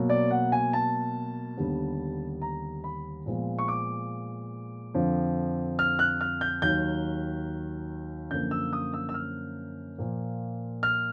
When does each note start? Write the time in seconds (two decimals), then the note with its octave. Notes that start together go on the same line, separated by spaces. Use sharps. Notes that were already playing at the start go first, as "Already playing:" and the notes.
Already playing: B2 F#3 A#3
0.10 D5
0.31 F#5
0.52 G#5
0.73 A5
1.57 D#2 D3 G3 B3
2.42 A#5
2.84 B5
3.26 A#2 F3 G#3 B3
3.59 C#6
3.68 D6
4.94 F2 D3 F3
5.79 F6
5.99 F#6
6.21 F6
6.41 G6
6.62 D#2 D#3 F#3 G6
8.31 F#2 D3 F3 A#3 G6
8.51 E6
8.73 D#6
8.94 E6
9.09 E6
9.14 F6
9.98 A#2 F3 A#3
10.83 F6